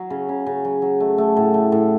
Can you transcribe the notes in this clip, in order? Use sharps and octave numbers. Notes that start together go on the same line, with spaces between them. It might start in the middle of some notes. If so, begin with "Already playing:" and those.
Already playing: F#3
C#3
C#3
C#3
F#3
F#3
A3
A3
A2
A3
A2